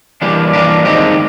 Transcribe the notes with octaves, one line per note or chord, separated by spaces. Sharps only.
E3 G3 A#3 D4 G4
E3 G3 A#3 D4 G4
D#3 G#3 C4 D#4 G4